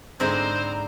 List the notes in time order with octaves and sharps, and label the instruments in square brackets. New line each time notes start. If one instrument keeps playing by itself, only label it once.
[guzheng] G#2 D3 E4 [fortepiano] G#3 C4 [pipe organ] C5 [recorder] A#5